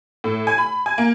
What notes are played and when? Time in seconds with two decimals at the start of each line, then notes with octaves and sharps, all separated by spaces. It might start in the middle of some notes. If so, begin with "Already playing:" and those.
0.24 A2
0.47 G#5
0.58 B5
0.86 G#5
0.98 A#3